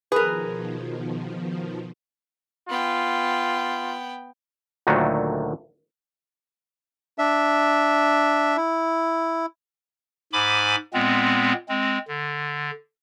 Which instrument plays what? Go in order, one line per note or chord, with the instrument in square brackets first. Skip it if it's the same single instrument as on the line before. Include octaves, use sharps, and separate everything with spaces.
[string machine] B2 D#3 F3 [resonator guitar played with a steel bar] G#4 A#4 [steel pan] B4
[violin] B3 G5 [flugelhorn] F4
[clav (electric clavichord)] D2 A#2 D3 D#3 F#3 A3
[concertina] D4 E5
E4
[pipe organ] G#2 G#5 B5 D6
A#2 G#3 B3 C4
G#3 C4
D3